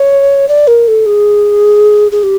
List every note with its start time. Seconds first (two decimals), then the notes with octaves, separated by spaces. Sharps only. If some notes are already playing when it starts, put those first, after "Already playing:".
Already playing: C#5
0.48 D5
0.68 A#4
0.88 A4
1.06 G#4
2.12 G#4
2.23 G4